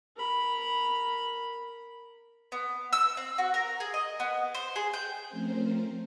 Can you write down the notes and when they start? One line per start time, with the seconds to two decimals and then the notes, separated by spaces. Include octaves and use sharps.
0.16 A#4 B5
2.52 B3
2.93 E6
3.17 C4
3.38 F#4
3.54 A#4
3.80 G#4
3.94 D#5
4.20 B3
4.54 C5
4.76 G#4
4.94 G5
5.28 F3 A3 C4 C#4 A#4 C5